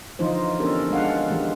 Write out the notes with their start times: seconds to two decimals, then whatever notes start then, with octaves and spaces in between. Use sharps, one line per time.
0.19 D3 E3 F3 D#4 F4 C5
0.59 B3 C#4 D4 G4 A4 A#4
0.90 G#3 D4 F5 F#5
1.30 E3 G#3 G4